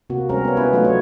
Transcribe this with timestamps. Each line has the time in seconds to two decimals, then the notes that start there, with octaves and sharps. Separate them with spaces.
0.10 C3 A#3 F#4
0.29 G3 G#3 A#3 C4 C#4 A#4
0.45 B3 C#5
0.57 B3 C#4 E4 B4
0.73 F#3 A3 D#4 F4 B4
0.85 F#3 C#5